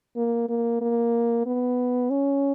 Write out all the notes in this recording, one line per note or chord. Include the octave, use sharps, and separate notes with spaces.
A#3
A#3
A#3
B3
C#4